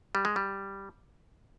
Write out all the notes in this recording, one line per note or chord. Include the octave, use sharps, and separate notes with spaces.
G3
G#3
G3